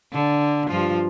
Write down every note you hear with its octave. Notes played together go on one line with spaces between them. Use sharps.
D3
G2 F3 F4